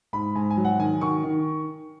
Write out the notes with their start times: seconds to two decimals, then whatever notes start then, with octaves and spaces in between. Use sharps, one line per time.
0.13 G#2 B5
0.35 G#2 G#5
0.50 G#5
0.57 F#3
0.65 F#5
0.79 D#3 G#5
1.01 D#3 C#6
1.24 D#3